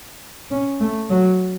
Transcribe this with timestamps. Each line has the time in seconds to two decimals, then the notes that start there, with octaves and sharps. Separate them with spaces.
0.51 C#4
0.81 A3
1.10 F#3